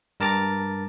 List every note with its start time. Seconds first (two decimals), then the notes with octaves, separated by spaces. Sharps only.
0.20 G2 A#4 A5 A#5 D6 A6